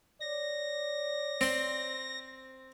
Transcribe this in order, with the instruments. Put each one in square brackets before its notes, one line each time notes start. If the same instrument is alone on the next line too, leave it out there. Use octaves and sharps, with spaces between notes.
[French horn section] C#5 D5 [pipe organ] A#6
[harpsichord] C4 C6